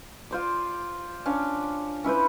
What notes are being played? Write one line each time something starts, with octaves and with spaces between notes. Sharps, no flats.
F4 C5 D5
C#4 D4 F5
C#4 E4 B4 C5